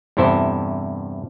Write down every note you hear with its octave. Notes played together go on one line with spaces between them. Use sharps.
E2 G2 C3 E4 A4 C5